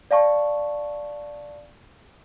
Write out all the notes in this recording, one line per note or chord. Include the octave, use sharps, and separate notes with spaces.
D5 F5 A5 C#6